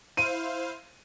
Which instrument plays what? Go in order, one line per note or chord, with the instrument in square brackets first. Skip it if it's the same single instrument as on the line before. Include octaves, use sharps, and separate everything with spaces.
[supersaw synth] E4 C5 F5 [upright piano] D#7